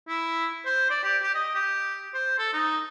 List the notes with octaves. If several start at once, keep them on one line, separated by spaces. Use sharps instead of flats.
E4
C5
D5
G4
G4
D#5
G4
C5
A4
D#4